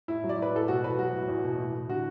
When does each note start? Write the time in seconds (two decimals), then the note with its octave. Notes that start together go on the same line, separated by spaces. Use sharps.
0.08 A2 E4
0.24 F#3
0.29 D5
0.38 A2 B4
0.54 A2 A4
0.68 B2 F#4
0.84 E2 B4
0.99 F#3 F#4
1.14 A2
1.28 E2
1.44 B2
1.59 A2
1.73 A2
1.89 D3 F#4